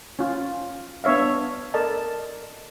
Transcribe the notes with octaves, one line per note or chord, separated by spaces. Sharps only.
C#4 F4
B3 D4 C#5 E5 F5
A4 A#4 D5 D#5 A5